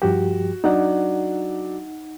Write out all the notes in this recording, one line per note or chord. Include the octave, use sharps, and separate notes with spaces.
G2 F3 F#4 G4
F#3 D4 D#4 F#5